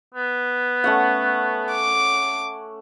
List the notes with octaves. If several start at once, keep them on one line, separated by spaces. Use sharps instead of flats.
B3
A3 C#4 F#5
D6